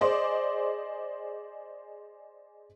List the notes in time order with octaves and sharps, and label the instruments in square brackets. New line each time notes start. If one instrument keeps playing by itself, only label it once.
[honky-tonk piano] G#4 C5 D5 D#5 C6 D6